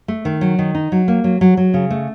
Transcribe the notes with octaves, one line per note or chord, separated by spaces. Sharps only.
A3
D#3
F#3
D#3
D#4
F#3
A#3
F#3
F#3
F#3
C#3
A3